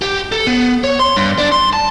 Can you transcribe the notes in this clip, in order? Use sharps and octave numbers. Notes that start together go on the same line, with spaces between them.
G4
A4
B3
C#5
C6
G2
D4
C6
A5